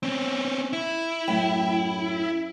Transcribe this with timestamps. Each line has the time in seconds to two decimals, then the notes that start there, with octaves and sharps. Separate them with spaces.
0.03 C4 C#4
0.73 E4
1.28 F#2 A2 G5